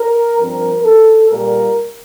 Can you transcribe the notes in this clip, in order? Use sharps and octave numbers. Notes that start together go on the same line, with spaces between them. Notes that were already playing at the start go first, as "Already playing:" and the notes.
Already playing: A#4
G2 F3 C4 A#4
A4
A#2 G3 A#3 A#4